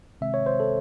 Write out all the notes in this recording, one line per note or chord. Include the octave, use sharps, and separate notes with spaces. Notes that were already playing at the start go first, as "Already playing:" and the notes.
C3 D#3 G#3 C4 E5
C#5
C5
A4